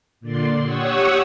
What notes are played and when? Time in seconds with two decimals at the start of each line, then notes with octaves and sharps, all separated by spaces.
0.20 A#2 D3 D5 C6
0.62 G4 C#5 F#5 C#6 D#6 E6